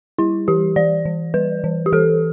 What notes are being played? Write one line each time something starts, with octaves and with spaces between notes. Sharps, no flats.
G3 E4
E3 G4
E3 D5
E3
G3 B4
E3
G4
E3 A4